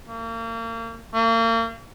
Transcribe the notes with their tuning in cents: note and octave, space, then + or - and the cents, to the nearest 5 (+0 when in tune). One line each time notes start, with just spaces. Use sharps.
A#3 -35
A#3 -40